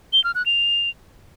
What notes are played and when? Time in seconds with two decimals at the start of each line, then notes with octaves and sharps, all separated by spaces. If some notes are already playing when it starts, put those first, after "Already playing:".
0.13 G7
0.24 F6
0.35 F#6
0.46 F7